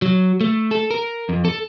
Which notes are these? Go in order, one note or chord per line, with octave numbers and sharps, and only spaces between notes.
F#3
A3
A4
A#4
F2
A4